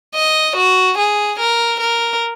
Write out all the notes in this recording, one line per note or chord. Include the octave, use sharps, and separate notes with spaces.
D#5
F#4
G#4
A#4
A#4